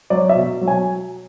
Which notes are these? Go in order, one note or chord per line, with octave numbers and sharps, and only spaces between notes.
F#3 D5
E5
B2
F#3
G#5